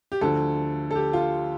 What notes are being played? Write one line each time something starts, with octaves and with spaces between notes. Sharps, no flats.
G4
D2 D3 F3 A4
A4
G4
F4